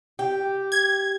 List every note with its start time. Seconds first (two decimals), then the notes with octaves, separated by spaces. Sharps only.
0.19 G4
0.72 G#6